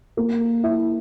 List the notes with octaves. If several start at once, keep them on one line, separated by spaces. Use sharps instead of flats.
A#3
E4